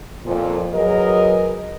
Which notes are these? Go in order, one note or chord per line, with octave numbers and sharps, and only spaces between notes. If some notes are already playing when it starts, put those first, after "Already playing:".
F2 A#2 F3
F#3 G#4 A#4 B4 D#5